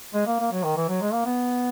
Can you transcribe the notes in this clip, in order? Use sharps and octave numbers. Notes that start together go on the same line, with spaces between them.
G#3
A#3
A#3
F#3
D#3
E3
F#3
G#3
A#3
B3